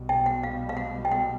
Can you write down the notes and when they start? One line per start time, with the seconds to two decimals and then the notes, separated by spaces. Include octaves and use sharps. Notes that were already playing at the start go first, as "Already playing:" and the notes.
Already playing: B1 B2 G3
0.09 G5
0.26 F#5
0.43 F5
0.69 F5
0.77 F#5
1.05 G5
1.11 F#5